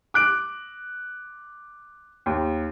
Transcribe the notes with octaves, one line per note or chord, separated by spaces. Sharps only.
D6 F#6 D7
D#2